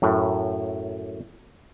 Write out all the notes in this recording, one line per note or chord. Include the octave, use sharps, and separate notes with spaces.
F#2 A2